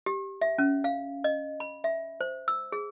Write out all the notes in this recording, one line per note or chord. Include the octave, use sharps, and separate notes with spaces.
G4
E5
C#4
F5
D#5
B5
E5
C5
E6
G#4